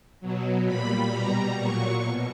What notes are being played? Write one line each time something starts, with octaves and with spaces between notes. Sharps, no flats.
B2 F#3
A#2 G3 B5
B2 G3 A#5
A#2 F#3 C#6
B2